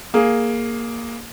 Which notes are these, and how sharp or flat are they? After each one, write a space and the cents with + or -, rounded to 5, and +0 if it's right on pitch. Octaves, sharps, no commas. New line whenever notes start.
A#3 +0 G#4 +0